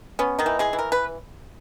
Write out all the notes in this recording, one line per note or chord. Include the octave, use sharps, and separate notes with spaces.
B3 C#4
D#3 D#4
E3
G#3 G#4
E3
A#4
B4